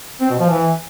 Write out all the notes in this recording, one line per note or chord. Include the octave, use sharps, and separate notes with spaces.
C4
B2
F3
E3